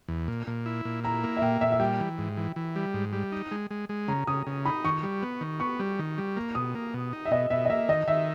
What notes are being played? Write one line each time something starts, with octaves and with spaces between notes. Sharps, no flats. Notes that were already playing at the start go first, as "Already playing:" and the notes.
E2
A#2
A#2
E4
A#2
E4 A#5
A#3
E5
A#2 G5
A#2 E5
E5
G3 G5
E3
G#2
E3
E3
G3
G#2
G3
D#4
G#3
G#3
G#3
C#3 A#5
C#3 D#6
C#3
D#4 B5
D#3 C#6
G3
B3
D#3
B3 C#6
G3
D#3
G3
A#3
B2 D#6
A#3
B2
D#4
E5
B2 D#5
B2 E5
D#5
A#3 E5
D#3 D#5
D#3 E5